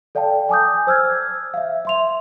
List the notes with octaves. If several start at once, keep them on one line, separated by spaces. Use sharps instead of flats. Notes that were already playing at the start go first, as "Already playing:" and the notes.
A4 D5 F5 G5 A5
G#5 A5 D6 D#6 G6
C5 E6 F6 G#6
E5 F5
E5 C6 F7